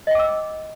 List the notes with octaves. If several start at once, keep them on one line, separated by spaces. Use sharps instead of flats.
D#5 G5 D6 E6